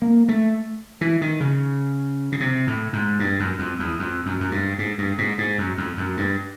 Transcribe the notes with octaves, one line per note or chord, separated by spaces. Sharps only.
A#3
A3
E3
D#3
C#3
C#3
C3
A2
G#2
G2
F#2
F2
E2
F2
F#2
F#2
G2
G#2
G2
G#2
G#2
F#2
F2
F#2
G2